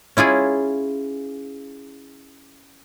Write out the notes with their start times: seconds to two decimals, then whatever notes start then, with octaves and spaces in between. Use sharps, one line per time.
0.17 C#4 E4 F4 G#4